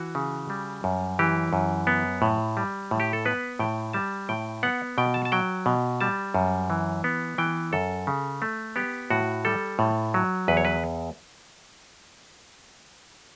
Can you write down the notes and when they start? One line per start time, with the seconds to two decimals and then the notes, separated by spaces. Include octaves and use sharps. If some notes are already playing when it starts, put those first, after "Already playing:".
Already playing: E3 F#4
0.15 C#3
0.50 G3
0.84 F#2
1.19 E3 G4
1.53 F#2
1.87 B3
2.22 A2
2.57 G3
2.91 A2
3.00 G4
3.13 A4
3.25 B3 B4
3.59 A2 G5
3.93 G3 A5
4.29 A2 G5
4.63 B3 F#5
4.98 B2 G5
5.14 A5
5.25 A5
5.32 F#3 G5
5.66 B2
6.01 G3 A5
6.34 F#2
6.70 E3
7.04 B3
7.38 E3 G5
7.73 F#2 A4
8.07 C#3
8.42 A3
8.76 B3 G4
9.10 A2 F#4
9.45 G3 A4
9.79 A2
10.14 F#3
10.48 E2 B4
10.57 C#5
10.65 B4